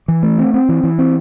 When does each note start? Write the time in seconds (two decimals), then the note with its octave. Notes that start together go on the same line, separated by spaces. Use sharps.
0.08 E3
0.23 A3
0.39 C4
0.54 C4
0.69 E3
0.84 E3
0.99 C4